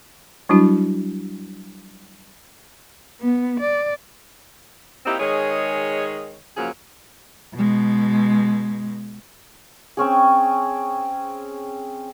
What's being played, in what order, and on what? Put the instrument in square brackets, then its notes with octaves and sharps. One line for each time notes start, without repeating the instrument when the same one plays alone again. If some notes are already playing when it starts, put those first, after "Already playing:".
[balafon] F#3 G3 D4 E4 F#4
[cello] B3
D5
[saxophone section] A#3 C4 D#4 E4 G4
D#3 G#3 G#4 C#5
C#3 F3 F#3 A#3 G#4
[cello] B2 G#3
[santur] C4 C#4 G#4